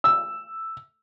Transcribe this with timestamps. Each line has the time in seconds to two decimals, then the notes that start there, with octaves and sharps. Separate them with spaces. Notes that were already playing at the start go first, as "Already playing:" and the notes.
0.04 E6